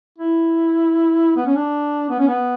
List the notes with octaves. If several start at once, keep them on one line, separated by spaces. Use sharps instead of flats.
E4
B3
C#4
D4
B3
C#4
B3